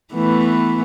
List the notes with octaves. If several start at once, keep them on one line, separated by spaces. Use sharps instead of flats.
E3 A3 B3